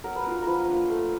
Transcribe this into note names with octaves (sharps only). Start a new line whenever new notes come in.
F#3 A#4
B4
B3 D4 F4 A#4
F3 A#4 B4
A#3 D4 F4
A3